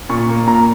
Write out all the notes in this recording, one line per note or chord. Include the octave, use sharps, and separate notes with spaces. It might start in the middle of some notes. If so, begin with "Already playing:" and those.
A#2 C#6
A#3
A#2 A#5